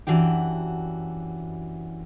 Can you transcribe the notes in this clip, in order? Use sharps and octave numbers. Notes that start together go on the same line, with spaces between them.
F#2 C3 E3 D4 F#4 G4